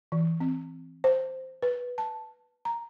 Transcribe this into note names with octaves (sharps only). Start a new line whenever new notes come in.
E3
C4
C5
B4
A5
A#5